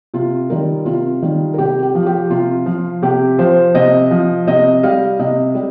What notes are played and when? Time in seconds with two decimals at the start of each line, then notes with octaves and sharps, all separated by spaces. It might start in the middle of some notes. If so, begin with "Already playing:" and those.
0.14 C3 F4
0.50 D#3 G3 A#4
0.86 C3 F4
1.22 D#3 G3
1.54 A#4
1.58 C3 G4
1.82 G4
1.95 F3
2.06 G4
2.30 C3 F4
2.66 F3
3.02 C3 G4
3.39 F3 C5
3.74 C3 D#5
4.11 F3
4.47 C3 D#5
4.83 G3 F5
5.19 C3 D#5
5.55 G3